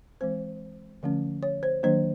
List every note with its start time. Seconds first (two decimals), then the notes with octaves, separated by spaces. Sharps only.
0.21 E3 G#3 C4 C5
1.03 D3 F3 A3 C#4
1.43 C#5
1.63 C5
1.83 D#3 F#3 A#3 D4 C5